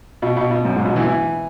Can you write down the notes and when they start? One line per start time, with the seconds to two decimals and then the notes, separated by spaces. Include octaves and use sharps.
0.22 B2
0.37 B2
0.51 B2
0.65 F#2
0.75 G#2
0.85 B2
0.96 E3
1.07 E3